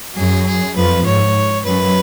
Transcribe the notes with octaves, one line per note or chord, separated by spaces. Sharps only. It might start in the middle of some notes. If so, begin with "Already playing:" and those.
F#2 F#3 G#4
G#4
F2 F3 B4
G#2 C#5
F#2 F#3 B4